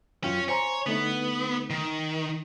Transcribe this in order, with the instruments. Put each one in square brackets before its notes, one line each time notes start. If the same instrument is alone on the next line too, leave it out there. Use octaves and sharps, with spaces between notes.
[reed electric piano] F#2 F4 G5 [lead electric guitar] C#4
[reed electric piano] C5 G#5 A#5 [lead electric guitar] C#5
[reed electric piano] D3 A3 D#4 [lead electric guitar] B3
[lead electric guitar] D#3